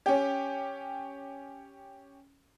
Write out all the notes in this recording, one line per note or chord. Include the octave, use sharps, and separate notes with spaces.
C#4 G4